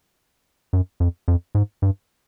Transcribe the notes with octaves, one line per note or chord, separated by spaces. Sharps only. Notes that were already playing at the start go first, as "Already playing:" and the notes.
F#2
F2
F2
G#2
G2